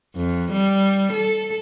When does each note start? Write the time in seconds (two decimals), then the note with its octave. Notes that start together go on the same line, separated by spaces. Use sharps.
0.15 F2
0.52 G3
1.13 A4